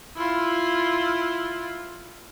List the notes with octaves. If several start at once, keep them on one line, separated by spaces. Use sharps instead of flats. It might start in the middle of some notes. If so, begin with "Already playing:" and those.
E4 F4